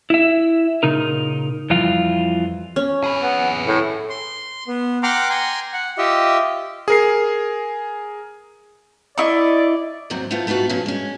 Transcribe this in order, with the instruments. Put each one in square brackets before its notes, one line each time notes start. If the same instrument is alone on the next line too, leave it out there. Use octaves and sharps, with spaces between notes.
[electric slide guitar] E4 E5
A#2 C#3 D#4 A#4
F2 E3 G3 F4
[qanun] C#4
[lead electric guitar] G#4 B4
[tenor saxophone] B3
A2
[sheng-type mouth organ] C6
B3
F#5 G5 A#5 C6 D6 F6
G5 G#5 A#5 C6
F#5
F4 G4 D#5 E5
[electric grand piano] G#4 A#4 C7
[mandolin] E4 D#5 C#6 [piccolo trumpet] D5
[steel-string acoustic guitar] D#2 G#2 F#3 A3 C4
A3 B3 C4 E4 F4
A3 B3 D#4 F4 F#4
G2 A#2 F3 C#4
G#3 C#4